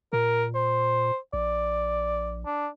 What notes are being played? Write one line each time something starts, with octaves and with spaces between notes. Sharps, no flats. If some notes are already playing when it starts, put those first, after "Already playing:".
A#2 A#4
C5
A#1 D5
D4